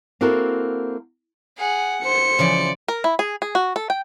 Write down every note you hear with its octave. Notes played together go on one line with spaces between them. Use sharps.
A#3 C4 E4 F#4 A4 A#4
G#4 F#5
C5 C#7
C#3 E3 F3 D5
A#4
E4
G#4
G#4
F#4
A4
G5